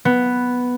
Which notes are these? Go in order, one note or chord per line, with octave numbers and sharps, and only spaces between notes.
B3